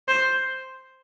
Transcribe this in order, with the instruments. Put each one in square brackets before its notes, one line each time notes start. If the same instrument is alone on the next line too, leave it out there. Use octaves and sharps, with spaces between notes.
[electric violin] C5